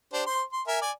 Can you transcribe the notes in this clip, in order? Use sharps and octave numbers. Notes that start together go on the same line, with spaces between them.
D4 G4 C5
C5 C6
C6
A#4 E5 G#5
D5 G#5